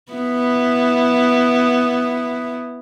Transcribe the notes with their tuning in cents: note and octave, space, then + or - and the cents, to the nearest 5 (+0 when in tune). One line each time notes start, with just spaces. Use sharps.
B3 +0 E4 +0